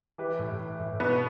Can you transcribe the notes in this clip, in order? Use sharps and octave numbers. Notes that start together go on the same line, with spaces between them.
E3 G4 B4
A2
E3
A2
B2 B3